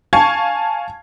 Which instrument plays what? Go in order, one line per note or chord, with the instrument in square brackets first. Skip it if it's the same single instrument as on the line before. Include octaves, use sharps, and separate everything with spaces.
[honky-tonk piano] F5 G#5 A5 C#6 G#6